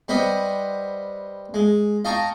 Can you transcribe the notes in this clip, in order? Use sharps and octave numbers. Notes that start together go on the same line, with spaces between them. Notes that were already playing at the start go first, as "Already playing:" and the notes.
G3 B4 C5 D#5 F#5 B5
G#3
D#5 F5 G5 A5 A#5 C#6